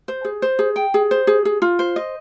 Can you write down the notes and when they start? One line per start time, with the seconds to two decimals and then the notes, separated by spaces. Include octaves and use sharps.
0.08 C5
0.25 G#4
0.42 C5
0.59 G#4
0.76 G5
0.94 G#4
1.11 C5
1.27 G#4
1.45 G#4
1.62 F4
1.79 C5
1.96 D#5